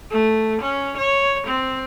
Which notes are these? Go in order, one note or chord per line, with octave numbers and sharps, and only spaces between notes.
A3
C#4
C#5
C4